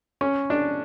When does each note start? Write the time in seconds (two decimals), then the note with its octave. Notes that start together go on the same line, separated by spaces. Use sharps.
0.21 C#4
0.50 D4